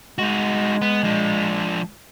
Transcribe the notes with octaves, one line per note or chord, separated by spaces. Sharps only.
G#3 D#4 F#4
B3
F3 D4